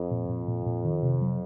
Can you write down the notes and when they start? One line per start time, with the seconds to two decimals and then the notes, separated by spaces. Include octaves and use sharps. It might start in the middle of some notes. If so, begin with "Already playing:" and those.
Already playing: F2
0.11 A#2
0.29 A#2
0.48 A#2
0.66 A#2
0.85 D#3
1.03 C3
1.22 F#3